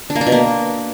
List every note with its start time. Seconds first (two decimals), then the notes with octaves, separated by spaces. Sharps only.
0.10 D4
0.15 A#3
0.21 D4
0.27 B2
0.32 A#3